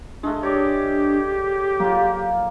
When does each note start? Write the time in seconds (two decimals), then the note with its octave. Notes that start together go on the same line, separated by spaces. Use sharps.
0.23 G#3 A3 D4
0.43 G4 C#5 D5
1.80 F#3 A#3 F4